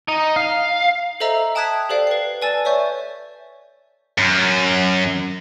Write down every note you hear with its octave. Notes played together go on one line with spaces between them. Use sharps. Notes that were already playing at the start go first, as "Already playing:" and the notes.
D#4
F5
A4 C5 D#5 E5 A#5 E6
G5 A5 D#6 F#6 G#6 B6
G4 A4 C5 D5 F5 G5
B4 C7
B4 D5 G#5 A5 E6 A6
C#5 D5 E5 C#6 G6
F#2